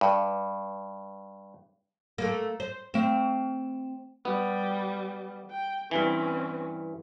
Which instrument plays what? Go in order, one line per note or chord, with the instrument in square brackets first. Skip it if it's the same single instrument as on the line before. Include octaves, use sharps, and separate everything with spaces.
[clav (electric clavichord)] G2
[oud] A3 A#3
C5
[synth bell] A3 E7 [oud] C4
[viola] G3 [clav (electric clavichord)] B3
[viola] G5
[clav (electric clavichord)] G2 E3 [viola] C4 C#4